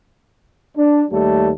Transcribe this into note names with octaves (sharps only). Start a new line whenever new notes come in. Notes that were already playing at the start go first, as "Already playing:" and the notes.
D4
D#2 G3 A3 A4